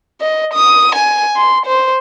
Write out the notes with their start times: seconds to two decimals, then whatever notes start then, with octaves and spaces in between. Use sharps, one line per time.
0.21 D#5
0.54 D#6
0.95 G#5
1.36 C6
1.66 C5